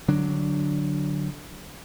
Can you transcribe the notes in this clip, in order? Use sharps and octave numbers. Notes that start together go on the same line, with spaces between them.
D3 F#3 D4